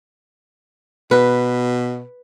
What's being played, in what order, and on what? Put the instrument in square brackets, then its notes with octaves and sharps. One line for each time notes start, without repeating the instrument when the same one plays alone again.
[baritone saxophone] B2 [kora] B4